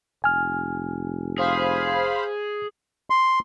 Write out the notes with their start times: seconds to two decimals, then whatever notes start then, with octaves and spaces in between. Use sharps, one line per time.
0.24 F1 G#5 F6
1.38 G#4 C5 F5 B5
3.10 C6